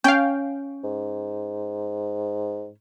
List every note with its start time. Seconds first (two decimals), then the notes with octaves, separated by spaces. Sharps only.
0.04 C#4 F5 G5
0.84 G#2